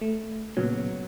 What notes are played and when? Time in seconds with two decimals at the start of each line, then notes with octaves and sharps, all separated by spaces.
0.01 A3
0.57 A#2 C#3 F#3 B3